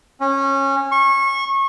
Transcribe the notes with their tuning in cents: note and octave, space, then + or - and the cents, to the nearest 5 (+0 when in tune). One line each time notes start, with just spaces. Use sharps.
C#4 -20
C#6 -25